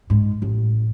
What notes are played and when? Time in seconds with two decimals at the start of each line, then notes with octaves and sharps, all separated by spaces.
0.10 G#2
0.42 A1